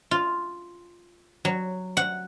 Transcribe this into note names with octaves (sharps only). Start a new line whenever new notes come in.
F4
F#3
F#5